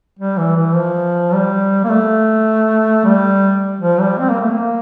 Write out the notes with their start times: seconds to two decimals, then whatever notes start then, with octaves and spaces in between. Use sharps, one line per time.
0.19 G3
0.37 E3
0.56 E3
0.75 F3
1.33 G3
1.84 A#3
1.89 A3
3.04 G3
3.80 F3
3.99 G3
4.18 C4
4.29 A#3
4.40 A3
4.51 A#3